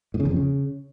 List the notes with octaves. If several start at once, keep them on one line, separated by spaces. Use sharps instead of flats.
A2
C#3
E2
F2
C#3